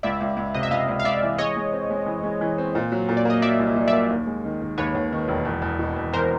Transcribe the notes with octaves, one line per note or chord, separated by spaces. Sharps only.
C#2 D5 E5
C#2
C#2
C3 D#5
E5
C#2 D#5 F5
C#2
F5
C#2 D5 E5
E3
G#3 C#5 D#5
G#3
C4
G#3
E3
G#3
E3
C4
A#2
F#3
A#2
D5
A#3 D#5
F#3 D5 E5
C2
F#3
D5 E5
A#3
D#2
G#3
D#3
D#3
D#2 B4 C#5
D#2
D#3
E1
E2
E2
B2
E2
E2 A#4 C5